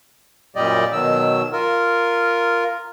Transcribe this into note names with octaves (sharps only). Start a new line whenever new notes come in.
F#2 A#2 G3 G4 D5 D#5
B2 D#3 F#3 E6
F4 A#4